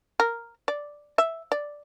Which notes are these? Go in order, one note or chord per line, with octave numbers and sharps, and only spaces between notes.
A#4
D5
E5
D5